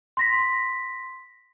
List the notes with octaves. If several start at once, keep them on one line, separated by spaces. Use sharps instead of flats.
C6 A#6 B6